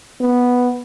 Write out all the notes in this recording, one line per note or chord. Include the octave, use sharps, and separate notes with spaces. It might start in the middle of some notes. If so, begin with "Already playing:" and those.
B3